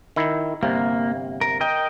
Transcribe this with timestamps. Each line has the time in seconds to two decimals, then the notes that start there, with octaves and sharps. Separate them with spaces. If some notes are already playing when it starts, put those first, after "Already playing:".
0.16 D#3 E4
0.63 G1 C3 A#3
1.41 A#4
1.61 A#4 D#5 G5